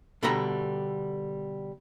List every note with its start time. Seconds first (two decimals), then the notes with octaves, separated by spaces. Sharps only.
0.23 B2 D3 G3 A4 A#5 B5